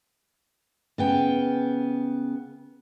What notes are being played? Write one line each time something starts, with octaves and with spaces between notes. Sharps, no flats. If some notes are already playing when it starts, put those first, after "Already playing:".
C#3 B3 G5